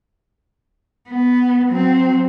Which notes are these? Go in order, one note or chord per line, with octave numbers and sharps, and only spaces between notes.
B3
F#3 C4